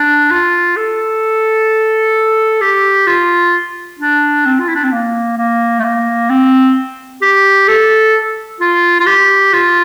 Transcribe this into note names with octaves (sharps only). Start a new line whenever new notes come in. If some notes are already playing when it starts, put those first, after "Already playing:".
Already playing: D4
F4
A4
G4
F4
D4
C4
F4
E4
D4
C4
A#3
A#3
A3
A#3
C4
G4
A4
F4
F4
G4
F4